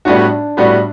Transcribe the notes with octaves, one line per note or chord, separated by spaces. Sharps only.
A2 G3 B3 D4 F#4
A2 G3 B3 F#4